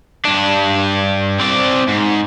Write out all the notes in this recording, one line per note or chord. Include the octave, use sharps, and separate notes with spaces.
G2 D4
C4 D5
G#2